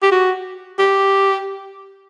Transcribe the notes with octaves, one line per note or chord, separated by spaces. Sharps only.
G4
F#4
G4